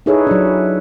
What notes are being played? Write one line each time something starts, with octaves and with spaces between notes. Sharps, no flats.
D#4 E4 G#4 A4 B4 C#5
F#3 D4